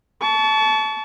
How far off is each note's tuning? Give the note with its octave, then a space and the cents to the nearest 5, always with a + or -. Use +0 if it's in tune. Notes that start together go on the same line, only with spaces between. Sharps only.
A5 -20 C#6 +35